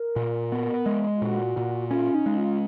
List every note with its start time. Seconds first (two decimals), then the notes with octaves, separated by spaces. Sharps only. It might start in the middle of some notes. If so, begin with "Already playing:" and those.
Already playing: A#4
0.16 A#2
0.52 B3
0.86 G#3
1.15 F4
1.22 A#2 F#4
1.57 A#2
1.91 C#4 F4
2.14 D#4
2.26 G#3
2.38 F4